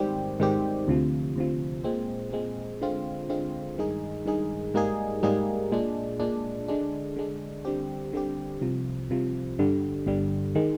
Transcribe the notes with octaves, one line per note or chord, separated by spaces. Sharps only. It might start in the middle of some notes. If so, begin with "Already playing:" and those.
Already playing: G#2 D#3 G3 C4 G4
G#2 D#3 G3 C4 G4
D2 C3 F3
D2 C3 F3
A#2 G#3 C4
A#2 G#3 C4
D3 G#3 C4 F4
D3 G#3 C4 F4
G2 D#3 G#3 D#4 G#4
G2 D#3 G#3 D#4 G#4
G#2 G3 A#3 D#4 G#4
G#2 G3 A#3 D#4 G#4
A#2 G#3 D4
A#2 G#3 D4
D3 G#3 D4
D3 G#3 D4
D3 G3 C4 G4
D3 G3 C4 G4
C2 C3 F3
C2 C3 F3
G1 G2 D3 G3
G1 G2 D3 G3
D#3 G#3